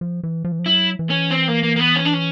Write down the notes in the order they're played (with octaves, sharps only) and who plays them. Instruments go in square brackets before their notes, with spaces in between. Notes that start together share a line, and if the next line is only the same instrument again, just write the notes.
[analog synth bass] F3
E3
F3
E3
F3
[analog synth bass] F#3 [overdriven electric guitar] E4
[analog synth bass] E3
[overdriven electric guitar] C#4
C4
A#3
A#3
A#3
B3
C#4
D4
C#4